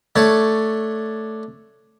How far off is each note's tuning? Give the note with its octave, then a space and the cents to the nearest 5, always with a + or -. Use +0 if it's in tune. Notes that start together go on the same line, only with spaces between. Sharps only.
A3 +0 D4 +0 C#5 +0